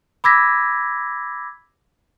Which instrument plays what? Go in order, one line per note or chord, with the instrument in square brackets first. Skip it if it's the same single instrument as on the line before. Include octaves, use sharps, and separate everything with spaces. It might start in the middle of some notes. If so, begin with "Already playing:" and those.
[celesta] B5 D6 E6 G#6 A#6 B6